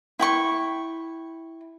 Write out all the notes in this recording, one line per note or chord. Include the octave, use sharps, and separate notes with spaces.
E4 G5 C#6